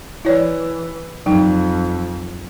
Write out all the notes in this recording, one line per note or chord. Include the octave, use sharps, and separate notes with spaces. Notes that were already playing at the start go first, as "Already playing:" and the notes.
E3 E4 C#5 D5
F2 F#3 D#4 G5